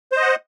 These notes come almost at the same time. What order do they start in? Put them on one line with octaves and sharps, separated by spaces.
C5 D#5 F#5